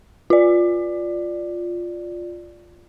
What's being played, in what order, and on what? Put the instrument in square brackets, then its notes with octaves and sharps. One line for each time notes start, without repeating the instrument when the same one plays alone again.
[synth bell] F4 D5